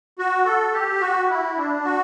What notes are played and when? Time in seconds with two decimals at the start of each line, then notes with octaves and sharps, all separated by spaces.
0.19 F#4
0.46 A4
0.73 G4
1.01 F#4
1.29 E4
1.57 D4
1.85 F#4